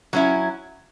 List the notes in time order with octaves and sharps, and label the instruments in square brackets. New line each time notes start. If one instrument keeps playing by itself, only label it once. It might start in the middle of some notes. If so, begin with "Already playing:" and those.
[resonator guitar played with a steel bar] F#3 C#4 E4